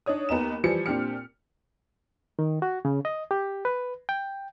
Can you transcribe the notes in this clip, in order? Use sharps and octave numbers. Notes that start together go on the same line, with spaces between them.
D4 D#4 C#5 D#6
D#2 B3 D#4 A#5 E7
E3 F3 G3 C#7
A#2 C4 D4 G4 F6 C#7
D#3
F#4
C#3
D#5
G4
B4
G5